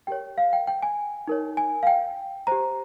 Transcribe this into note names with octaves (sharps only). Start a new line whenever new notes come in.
G4 A#4 C#5 G5
F5
G5
G5
G#5
D#4 A#4 C#5
G#5
F5
G5
G4 C5 A#5